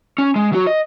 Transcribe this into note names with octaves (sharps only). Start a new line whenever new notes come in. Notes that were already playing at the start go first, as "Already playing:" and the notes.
C#4
G#3
F#3 F#4
D#5